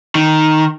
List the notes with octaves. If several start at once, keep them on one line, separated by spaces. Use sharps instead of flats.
D#3